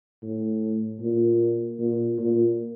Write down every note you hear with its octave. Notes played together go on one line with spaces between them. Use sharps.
A2
A#2
A#2
A#2